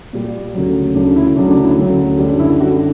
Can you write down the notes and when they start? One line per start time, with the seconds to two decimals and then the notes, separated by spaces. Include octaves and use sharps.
0.13 A#2 G3
0.54 D2 C#3 F#3
0.95 D2 C#3 F#3 D4
1.16 E4
1.36 D2 C#3 F#3 D4
1.50 D4
1.64 E4
1.78 D2 C#3 F#3
2.18 F#2 D3 G3
2.39 E4
2.60 F#2 D3 G3 F#4